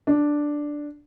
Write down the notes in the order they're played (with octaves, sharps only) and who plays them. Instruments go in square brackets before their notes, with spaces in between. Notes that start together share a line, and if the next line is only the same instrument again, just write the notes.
[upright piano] D4